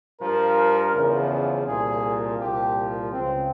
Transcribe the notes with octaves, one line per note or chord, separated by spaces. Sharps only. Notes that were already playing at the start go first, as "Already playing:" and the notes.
G2 F3 A#4
E2 C#3 F3
C2 A#2 F3 G#4
C2 A#2 F3 G4
C#2 C#3 F3 C4